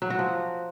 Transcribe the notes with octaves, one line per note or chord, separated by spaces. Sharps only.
F#3
F#4
F3